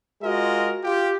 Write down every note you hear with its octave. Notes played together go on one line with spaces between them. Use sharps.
G#3 F4 F#4 A#4 D#5
F4 G4